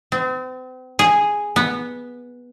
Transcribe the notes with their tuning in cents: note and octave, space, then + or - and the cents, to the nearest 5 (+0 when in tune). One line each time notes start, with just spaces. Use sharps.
C4 -40
G#4 -5
B3 -10